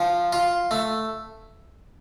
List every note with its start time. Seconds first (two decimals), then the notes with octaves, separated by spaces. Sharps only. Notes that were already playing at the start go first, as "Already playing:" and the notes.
Already playing: F3
0.33 F4
0.71 A3